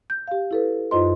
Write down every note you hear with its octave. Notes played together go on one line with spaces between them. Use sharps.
G6
G4 F5
E4 A4 B4
F#2 D#4 F4 C5 D#5 C6